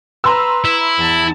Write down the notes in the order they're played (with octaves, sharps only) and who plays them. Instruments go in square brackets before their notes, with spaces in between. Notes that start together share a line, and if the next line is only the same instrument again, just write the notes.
[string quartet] B4 [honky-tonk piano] A#5 C6 E6
[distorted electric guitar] E4
[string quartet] E2 A5